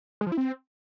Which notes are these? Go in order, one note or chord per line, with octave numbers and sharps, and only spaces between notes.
G#3
F3
E4
C4